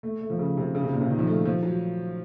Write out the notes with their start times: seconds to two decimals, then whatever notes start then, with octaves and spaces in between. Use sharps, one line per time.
0.03 A3
0.21 A3
0.30 F3
0.39 C#3
0.57 C3
0.75 C#3
0.83 C3
0.92 A#2
1.01 C3
1.10 D#3
1.19 F3
1.27 A3
1.45 F3
1.63 F#3